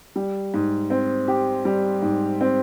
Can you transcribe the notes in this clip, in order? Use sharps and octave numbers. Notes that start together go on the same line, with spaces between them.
G3
G#2
C4
G4
G3
G#2
C4